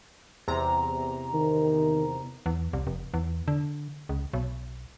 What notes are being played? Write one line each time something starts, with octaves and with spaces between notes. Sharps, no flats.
E2 C3 A#5
D#3
E2
C2
F1
E2
D3
C#2
B1